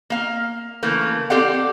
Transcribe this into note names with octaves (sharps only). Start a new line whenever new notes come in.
A#3 F5
C#3 E3 A3 A#3
C4 G4 A4 D5 F5 F#5